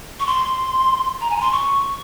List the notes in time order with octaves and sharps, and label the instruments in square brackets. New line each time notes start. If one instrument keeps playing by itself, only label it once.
[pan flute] C#6
C6
A#5
G#5
A#5
C6
C#6